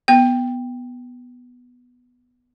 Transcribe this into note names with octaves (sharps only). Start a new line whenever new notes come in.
B3 G5